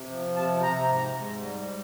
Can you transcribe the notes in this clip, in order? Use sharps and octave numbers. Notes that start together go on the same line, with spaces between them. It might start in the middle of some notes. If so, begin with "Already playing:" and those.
Already playing: C3
F3
C3 A5
C3 A#5
G#2
G#2
G3